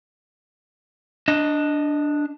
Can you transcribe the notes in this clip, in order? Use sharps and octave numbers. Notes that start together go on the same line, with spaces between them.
D4 D#5